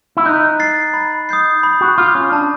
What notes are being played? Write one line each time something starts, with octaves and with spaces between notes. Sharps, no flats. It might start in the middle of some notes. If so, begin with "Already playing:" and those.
E4
D#4 F#6
A6 C7
B5
D#6 G6 C7
B5
F#4
F4 D6 G6
C#4
D4 A5